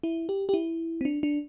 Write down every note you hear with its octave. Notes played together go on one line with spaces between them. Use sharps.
E4
G4
G4
E4
C4
D4
D4